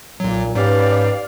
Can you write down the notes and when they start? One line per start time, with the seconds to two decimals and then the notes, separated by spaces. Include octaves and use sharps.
0.20 B1 A#2 F#3
0.55 G#2 C#4 G4 B4 D5 F5